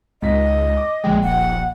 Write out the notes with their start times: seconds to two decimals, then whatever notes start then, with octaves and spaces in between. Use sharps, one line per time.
0.22 C#2 G#2 D#5 B6
0.77 D6
1.04 A#1 G#3 G5
1.24 D#1 F#5